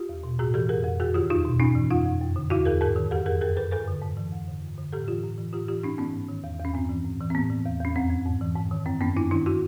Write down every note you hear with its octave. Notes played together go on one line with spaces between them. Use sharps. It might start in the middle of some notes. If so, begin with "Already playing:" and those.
Already playing: F4 G4
E2
B2
A2 F#4 G#4
E3 G4 A4
F2 G#4 A#4
F2
F#2 F#4 G#4
D#3 F4 G4
E2 D#4 F4
B2
G2 C#4 D#4
E3
F2 D#4 F4
F2
F#2
D3
E2 E4 F#4
E2 G#4 A#4
G#2 G#4 A#4
D#3
F2 G4 A4
F2 G#4 A#4
F#2 G#4 A#4
F#2 A4 B4
G2 A4 B4
D3
G#2
E3
F2
D3
G2
D3
A2 G4 A4
E3 F4 G4
A2
E3
A2 F4 G4
E3 F4 G4
G2 C#4 D#4
E3 B3 C#4
G#2
D#3
E2
E2
C#4
G2 C4
E3
A2
E3
C4
A2 B3
E3
E2
E2 C#4
F2 C4
F2
G#2
E3
G#2
D#3
F#2 C4
F#2 B3 C#4
G2 D4 E4
D#3 D4 E4
E4 F#4